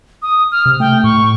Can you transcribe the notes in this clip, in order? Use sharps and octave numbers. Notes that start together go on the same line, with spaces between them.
D#6
F6
C3
A3 G5
A2 C#6